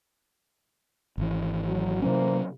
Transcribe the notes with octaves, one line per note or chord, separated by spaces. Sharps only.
G#1 E3
F#3
C3 E3 F#3 A#3 C#4 C5